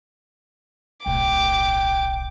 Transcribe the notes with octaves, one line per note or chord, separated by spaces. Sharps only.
D1 B1 G5 D6